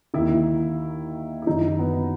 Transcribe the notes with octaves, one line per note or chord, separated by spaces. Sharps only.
D#2 D#3 E4
E4
F#2 D#3 D#4
B3